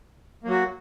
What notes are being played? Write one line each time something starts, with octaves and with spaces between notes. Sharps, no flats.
F#3 A#3 F#4